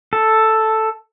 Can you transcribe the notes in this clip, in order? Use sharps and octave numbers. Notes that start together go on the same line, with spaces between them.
A4